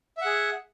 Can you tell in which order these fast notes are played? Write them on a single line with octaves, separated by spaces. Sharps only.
E5 F#5 G#4